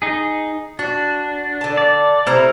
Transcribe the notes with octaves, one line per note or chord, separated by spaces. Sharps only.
D#4 G#4
D4 F#4
D3 A5
D5
C3 A3 E4 C5 A#5 F6